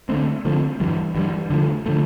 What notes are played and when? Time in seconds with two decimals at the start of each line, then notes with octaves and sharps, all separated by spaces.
0.09 D3 F3 A3 C4
0.45 D3 F3 A3 C4
0.80 G2 E3 G3
1.15 G2 E3 G3
1.50 D3 F3 A3
1.86 D3 F3 A3